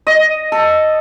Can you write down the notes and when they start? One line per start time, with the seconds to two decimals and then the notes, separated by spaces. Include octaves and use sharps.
0.07 D#5
0.52 A4